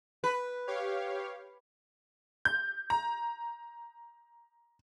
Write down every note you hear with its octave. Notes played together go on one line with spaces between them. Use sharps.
B4
G4 C#5 F5
G6
A#5